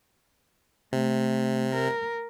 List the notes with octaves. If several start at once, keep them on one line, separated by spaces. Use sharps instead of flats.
C3 A3
A#4